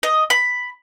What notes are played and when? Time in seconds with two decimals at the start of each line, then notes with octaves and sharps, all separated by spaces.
0.03 D#5
0.30 B5